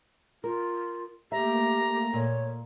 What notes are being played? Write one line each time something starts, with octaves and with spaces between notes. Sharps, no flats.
F4 A#4
A3 A#3 G4 E5 A#5
A#2 C#5